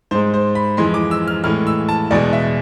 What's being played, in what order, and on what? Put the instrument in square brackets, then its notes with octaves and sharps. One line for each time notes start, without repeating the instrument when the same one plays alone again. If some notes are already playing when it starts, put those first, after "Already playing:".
[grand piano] G#2 G#3 C5
C5
B5
F2 E3 G#3 C6
D6
E6
F6
A2 E3 G#3 F6
E6
A5
E2 B2 G#3 D5
E5